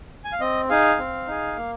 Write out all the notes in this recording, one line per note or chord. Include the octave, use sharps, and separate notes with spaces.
G#5
F5
C4 D#5
D#4 G#4 F5
C4
D#4 G#4
A#3